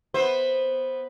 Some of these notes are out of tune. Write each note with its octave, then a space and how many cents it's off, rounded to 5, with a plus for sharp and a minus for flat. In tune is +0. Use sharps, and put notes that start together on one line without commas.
B3 +0 C5 +5 E5 +0